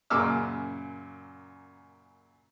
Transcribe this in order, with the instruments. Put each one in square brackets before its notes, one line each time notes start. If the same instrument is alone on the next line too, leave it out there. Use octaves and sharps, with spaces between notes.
[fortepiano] F#2 A#2 C#3 D6 E6 F6